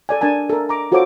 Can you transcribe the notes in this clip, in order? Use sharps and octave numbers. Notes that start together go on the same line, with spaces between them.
A4 D5 G#5
D4 A#4 G#5 A5
A4 A#4
A#5 D6
F4 F#4 A4 C5 C#5 D6